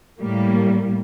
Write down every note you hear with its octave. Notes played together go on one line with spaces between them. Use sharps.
A2 G3 A#3